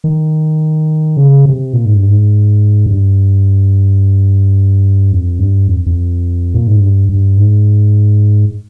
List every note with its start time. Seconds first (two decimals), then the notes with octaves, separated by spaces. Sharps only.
0.04 D#3
1.17 C#3
1.45 C3
1.73 A#2
1.85 G#2
1.97 G2
2.08 G#2
2.86 G2
5.12 F2
5.39 G2
5.67 F2
5.86 F2
6.54 A#2
6.67 G#2
6.80 G2
7.09 G2
7.37 G#2